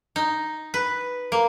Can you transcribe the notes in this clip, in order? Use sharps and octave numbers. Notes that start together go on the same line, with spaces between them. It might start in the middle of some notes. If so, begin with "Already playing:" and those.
D#4
B4
A#3